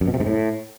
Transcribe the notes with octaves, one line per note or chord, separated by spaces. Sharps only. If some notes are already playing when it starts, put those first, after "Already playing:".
F#2
B2
C3
G#2
A2